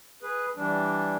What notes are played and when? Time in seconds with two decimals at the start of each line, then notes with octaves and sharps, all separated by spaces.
0.23 G#4 B4
0.56 E3 G3 D4